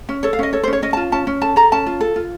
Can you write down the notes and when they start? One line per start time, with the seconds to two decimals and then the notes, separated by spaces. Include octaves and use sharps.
0.09 C#4
0.23 A4 C#5
0.33 F5
0.39 C#4 D#5
0.53 A4 C#5
0.64 C5
0.68 C#4
0.73 C#5
0.82 C#4 D#5
0.93 A5
0.97 F4
1.12 C#4 A5
1.27 C#4
1.42 A4 A5
1.56 A4 A#5
1.72 C#4 A5
1.86 F4
2.01 A4
2.16 F4